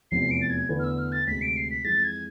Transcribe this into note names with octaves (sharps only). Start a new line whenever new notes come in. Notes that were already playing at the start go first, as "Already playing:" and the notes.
F1 E2 C3 E3 B3 C7
D7
A6
G#6
E2 D3 A3 E4 B4
F6
E6
F6
A6
D2 C3 G#3 B6
D7
C7
B6
F2 E3 G#3 A6
G#6